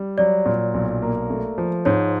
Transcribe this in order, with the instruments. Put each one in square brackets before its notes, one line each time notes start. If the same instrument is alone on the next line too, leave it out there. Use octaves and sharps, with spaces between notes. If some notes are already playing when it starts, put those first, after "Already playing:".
Already playing: [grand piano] G3
[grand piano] F#3 [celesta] D5
[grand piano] A#2
B1
A#3
A3
F3
[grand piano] G#2 [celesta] C#5